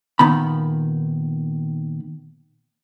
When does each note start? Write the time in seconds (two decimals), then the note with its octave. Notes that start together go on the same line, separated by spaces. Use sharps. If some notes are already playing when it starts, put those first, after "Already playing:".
0.19 A#2 D#3 B3 B5